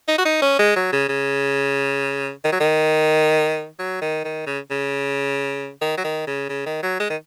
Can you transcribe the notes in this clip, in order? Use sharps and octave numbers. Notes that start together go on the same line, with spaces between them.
D#4
F#4
D#4
C#4
G#3
F#3
C#3
C#3
D#3
F#3
D#3
F#3
D#3
D#3
C#3
C#3
D#3
F#3
D#3
C#3
C#3
D#3
F#3
G#3
D#3